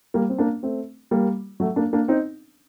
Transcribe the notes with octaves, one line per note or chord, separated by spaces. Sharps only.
G3 A#3
C4
A#3 D4
A3 C4
G3 A#3
F#3 A3
A#3 D4
A#3 D4
C4 D#4